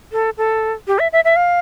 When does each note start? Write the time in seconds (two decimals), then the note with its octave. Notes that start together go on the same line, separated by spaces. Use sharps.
0.13 A4
0.38 A4
0.87 G4
0.99 E5
1.13 E5
1.25 E5
1.36 F5